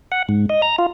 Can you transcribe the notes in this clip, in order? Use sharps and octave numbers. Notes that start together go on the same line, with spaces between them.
F#5
G#2
D#5
A#5
F4